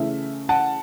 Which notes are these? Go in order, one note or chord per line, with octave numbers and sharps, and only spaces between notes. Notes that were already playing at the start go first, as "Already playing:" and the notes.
Already playing: C#3 E3 A3 E5
F#5 A5